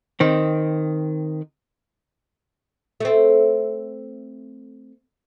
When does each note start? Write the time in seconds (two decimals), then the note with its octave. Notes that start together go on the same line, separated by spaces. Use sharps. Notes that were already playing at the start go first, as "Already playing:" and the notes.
0.20 D#3 C4
3.00 A3 C4